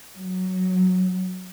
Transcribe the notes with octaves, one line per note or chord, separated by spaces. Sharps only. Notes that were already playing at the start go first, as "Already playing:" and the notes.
F#3